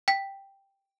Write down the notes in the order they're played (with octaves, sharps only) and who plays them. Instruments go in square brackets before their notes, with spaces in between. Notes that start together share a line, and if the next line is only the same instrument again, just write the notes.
[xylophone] G5 B6